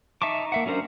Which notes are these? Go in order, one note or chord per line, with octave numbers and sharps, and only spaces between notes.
D#4 E5 A5 C#6 D6
A#3 E5 F#5
F#3 C#4 D4 A#4 C5